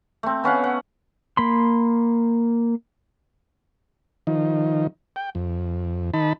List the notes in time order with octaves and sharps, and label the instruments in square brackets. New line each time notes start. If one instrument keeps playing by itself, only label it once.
[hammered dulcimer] A3 C4
B3 C#4 F5 F#5
F#5
[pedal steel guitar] A#3 B5 C6
[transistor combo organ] D#3 F3 D#4
G5
F2
D#3 D#4 A5 B5